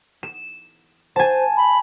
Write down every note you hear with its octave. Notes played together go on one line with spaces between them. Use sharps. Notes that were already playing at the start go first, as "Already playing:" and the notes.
E7
C5 G#5 A5
B5